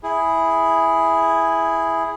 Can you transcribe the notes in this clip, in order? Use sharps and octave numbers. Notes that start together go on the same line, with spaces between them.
E4 G#4